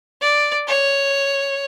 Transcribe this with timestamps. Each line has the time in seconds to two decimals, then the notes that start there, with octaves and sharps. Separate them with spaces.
0.21 D5
0.68 C#5